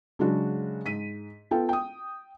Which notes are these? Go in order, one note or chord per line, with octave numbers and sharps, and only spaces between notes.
C#3 F#3 G#3 D4 F#4
G#2 B6 D#7
B3 F4 A4 G5
G5 D#6